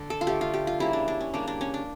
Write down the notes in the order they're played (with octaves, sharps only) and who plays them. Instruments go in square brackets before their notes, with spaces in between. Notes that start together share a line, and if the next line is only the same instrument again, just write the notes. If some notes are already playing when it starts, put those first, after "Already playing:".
Already playing: [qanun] D3
A4
F4
D3 A3 G4
F4
G4
F4
C#3 G3 A#3 E4
D4
D4
C#4
C#3 G3 A#3 D4
D4
C#4
D4